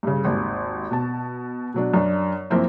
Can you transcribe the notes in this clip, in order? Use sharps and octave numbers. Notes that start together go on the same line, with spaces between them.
G2 C#3
G#1 D#2
B2 A5
B2 F#3 D4
F#2 D4
F#2 F3 A#3 C4 E4